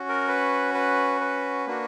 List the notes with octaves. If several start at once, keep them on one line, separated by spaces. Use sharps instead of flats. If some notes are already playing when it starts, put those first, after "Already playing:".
Already playing: C#4 F#4
A#4
B4
B4
B4
A#3 D4 F#4